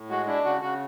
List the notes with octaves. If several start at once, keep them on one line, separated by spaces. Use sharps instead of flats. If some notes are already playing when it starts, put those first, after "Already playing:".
Already playing: A2
G#3 F#4
D4 E4
C#3 F#4
C#3 F#4